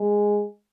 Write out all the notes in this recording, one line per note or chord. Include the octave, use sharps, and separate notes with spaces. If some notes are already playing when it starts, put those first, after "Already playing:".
Already playing: G#3